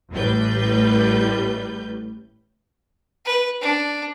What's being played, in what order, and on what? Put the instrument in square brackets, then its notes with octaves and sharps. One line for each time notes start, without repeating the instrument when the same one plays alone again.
[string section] A1 A2 G3 B4 G6
[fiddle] B4
D4